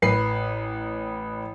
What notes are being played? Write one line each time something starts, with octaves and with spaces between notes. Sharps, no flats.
A1 B4 C7